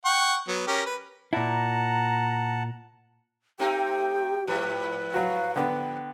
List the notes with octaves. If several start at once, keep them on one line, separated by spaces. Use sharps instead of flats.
F#5 G5 C#6
F#3 B3
C#4 G4 A#4
B4
A#2 E4 F#5 A5 A#5
A3 C4 D#4 G4 G5
G#2 F3 G3 B4
F#3 F#4 F5
D3 B3 G5